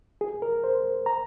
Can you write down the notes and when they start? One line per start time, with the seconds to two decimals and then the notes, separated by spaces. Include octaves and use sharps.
0.21 G#4
0.42 A#4
0.64 C5
1.06 A#5